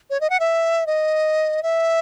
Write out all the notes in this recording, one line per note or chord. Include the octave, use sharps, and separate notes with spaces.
C#5
D#5
F#5
E5
D#5
E5